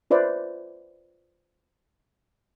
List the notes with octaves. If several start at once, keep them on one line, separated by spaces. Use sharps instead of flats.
F4 B4 C5 D5 E5